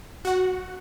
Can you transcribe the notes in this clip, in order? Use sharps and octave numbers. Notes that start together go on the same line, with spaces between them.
F#4 F#5